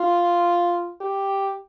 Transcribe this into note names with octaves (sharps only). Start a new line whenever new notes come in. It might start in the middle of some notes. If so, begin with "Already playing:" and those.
Already playing: F4
G4